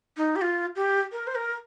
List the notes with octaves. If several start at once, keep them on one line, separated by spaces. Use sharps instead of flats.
D#4
G4
F4
G4
A#4
C5
A#4